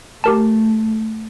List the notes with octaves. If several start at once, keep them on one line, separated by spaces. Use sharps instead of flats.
A3 G4 A#4 A5